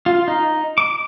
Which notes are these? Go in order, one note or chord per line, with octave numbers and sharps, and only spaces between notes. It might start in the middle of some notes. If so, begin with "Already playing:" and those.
F4
D#4
D6